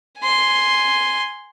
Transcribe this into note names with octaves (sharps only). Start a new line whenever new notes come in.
G#5 C6